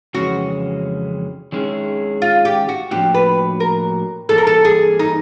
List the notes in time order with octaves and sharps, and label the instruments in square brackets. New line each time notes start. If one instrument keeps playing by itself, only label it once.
[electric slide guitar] F2 C#3 E3 G#3 C#4 [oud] F#4
[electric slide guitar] D#3 G#3 C#4 E4 G#4
[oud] F4
G4
F#4
[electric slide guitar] A2 F3 A#3 D4 F#4 [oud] G4
[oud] B4
A#4
[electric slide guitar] G2 E3 G3 A#3 [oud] A4
[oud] A#4
A4
G#4
D#4